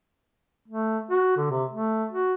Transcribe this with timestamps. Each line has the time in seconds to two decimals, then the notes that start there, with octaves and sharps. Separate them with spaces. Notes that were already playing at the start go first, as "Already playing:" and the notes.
0.68 A3
1.10 F#4
1.37 D3
1.51 C3
1.71 A3
2.11 F#4